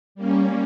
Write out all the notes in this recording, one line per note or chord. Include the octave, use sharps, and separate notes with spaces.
G3 A#3 C#4